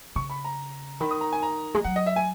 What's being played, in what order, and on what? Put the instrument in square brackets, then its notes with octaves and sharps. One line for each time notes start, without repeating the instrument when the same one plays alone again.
[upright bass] C#3 [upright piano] C#6
[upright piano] B5
A#5
[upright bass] D#3 [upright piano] B5
[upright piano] D#6
A#5
G#5
A#5
[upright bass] G#3
[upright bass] F#3 [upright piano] F#5
[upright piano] D#5
E5
G#5